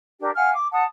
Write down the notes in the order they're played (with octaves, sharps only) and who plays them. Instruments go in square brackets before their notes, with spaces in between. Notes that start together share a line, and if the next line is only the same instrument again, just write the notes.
[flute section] D4 G4 A#4
F5 F#5 G#5 F6
D6
F#5 A5 D#6